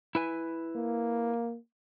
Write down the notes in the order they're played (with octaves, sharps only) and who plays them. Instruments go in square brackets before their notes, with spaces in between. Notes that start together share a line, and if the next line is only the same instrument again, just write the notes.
[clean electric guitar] E4 B4 G#5
[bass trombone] A#3